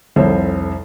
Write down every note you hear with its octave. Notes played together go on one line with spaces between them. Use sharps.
F1 C2 F2 C5 C#5 E5